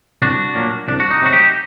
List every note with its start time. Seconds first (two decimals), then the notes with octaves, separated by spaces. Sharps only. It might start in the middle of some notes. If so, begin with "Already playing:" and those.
0.22 C2 D4 F#4
0.55 A#2 F#3 A#3
0.88 C2 D4
1.00 F#4
1.11 D#4
1.22 C3 F#3 A3 F#4
1.32 D#4 G4